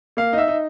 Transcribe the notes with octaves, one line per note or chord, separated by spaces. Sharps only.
A#3 F5
D#4
E5
D#4